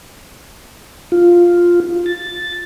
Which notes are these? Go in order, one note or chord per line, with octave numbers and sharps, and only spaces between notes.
F4
A6